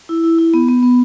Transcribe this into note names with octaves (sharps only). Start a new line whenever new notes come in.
E4
E4
E4
B3
B3
B3